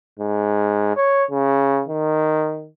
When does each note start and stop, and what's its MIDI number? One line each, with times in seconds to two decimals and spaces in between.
0.19 0.94 44
0.96 1.24 73
1.31 1.83 49
1.88 2.68 51